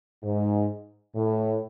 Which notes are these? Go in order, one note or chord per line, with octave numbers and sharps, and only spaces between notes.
G#2
A2